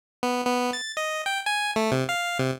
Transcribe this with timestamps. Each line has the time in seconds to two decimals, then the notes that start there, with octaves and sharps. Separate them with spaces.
0.23 B3
0.46 B3
0.73 A6
0.97 D#5
1.26 G5
1.46 G#5
1.76 A3
1.92 C3
2.09 F5
2.39 C3